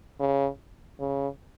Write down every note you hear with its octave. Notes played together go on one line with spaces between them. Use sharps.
C#3
C#3